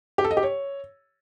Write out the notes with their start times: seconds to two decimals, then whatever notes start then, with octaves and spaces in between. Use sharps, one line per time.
0.18 G4
0.24 A4
0.31 D#5
0.37 G4
0.43 C#5